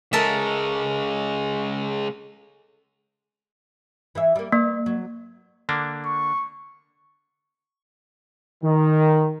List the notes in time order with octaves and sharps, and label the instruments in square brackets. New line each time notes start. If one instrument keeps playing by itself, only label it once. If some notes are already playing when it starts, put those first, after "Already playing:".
[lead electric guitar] C#3 G#3 [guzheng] A4 A#4 E5
[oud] E3 G#4 E5
G3 A#3
[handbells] A#3 [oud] B3
[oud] F#3
[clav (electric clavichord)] D3 A#3 D4
[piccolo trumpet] C#6
[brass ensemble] D#3